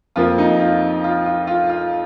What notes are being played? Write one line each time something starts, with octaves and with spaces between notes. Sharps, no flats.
F2 F3 A#3 F4
D#4
F4
F4
F4
F4
F4